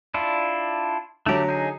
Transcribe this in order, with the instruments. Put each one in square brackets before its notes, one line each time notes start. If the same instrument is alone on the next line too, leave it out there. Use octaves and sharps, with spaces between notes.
[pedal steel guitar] D4 E4 F4
[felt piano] D3 F#3 [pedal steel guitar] A3 G4
[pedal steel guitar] D#4 G#4